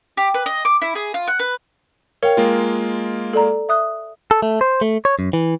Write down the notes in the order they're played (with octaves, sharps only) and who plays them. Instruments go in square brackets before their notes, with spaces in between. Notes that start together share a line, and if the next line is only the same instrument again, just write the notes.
[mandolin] G4
B4
D#5
D6
E4
G#4
F4
F#5
B4
[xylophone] A#4 G5 [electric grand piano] C#5 F5
[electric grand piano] G#3 A#3 F4
[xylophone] A4 D5 A#5
E5 D#6 F#6
[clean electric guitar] A4
A3
C5
A3
C#5
F#2
E3